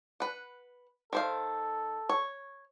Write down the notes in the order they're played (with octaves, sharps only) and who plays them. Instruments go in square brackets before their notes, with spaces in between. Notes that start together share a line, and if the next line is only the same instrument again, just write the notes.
[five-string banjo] B4 F#5
[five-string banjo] D#3 C5 F5 [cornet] A4
[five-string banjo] C#5